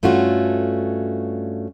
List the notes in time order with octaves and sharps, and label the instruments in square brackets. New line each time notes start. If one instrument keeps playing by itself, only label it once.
[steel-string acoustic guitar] G2 A3 C#4 F4 F#4